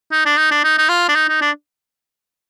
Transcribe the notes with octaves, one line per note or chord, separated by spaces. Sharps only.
D#4
D4
D#4
D4
D#4
D#4
F4
D4
D#4
D#4
D4